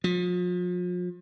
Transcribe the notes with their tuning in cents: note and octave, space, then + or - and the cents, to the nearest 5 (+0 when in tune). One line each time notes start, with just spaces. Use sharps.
F3 +40